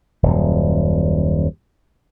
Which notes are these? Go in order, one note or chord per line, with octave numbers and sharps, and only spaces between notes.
D#1 F#2